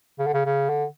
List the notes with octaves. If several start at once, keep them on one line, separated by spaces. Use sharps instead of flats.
C#3
D3
C#3
C#3
D3